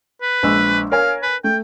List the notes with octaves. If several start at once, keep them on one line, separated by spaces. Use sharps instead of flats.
B4
A#1 G#3 E6
A#4 C#5 F5 G#5
B4
A3 G5